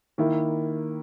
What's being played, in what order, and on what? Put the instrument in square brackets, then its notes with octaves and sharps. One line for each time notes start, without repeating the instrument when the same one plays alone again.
[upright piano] D#3 A#3 E4